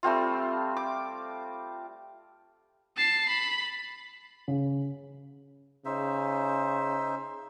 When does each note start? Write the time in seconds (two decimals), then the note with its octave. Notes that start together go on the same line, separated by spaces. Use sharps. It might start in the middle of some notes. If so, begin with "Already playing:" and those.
0.03 G3 A3 C4 F4
0.77 D6
2.97 A5 C7
3.29 B5
4.48 C#3
5.85 C#3 D#4 C5 E5